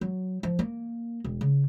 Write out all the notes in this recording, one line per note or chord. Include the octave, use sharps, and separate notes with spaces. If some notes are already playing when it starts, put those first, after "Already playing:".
F#3
F3
A#3
E1
C#3